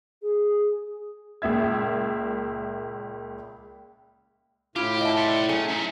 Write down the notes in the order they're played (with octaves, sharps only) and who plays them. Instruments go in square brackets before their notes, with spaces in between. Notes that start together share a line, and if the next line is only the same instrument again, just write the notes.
[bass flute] G#4
[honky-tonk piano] C#2 A#2 E5 G#6
[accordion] A2 [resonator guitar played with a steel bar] E4 F4 [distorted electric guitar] G4
[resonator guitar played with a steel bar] D#5 E5 A5
[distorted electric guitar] D5 C6
[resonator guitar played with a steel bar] F#3 A3 G#4 [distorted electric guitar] C#4
[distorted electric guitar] D#4 E5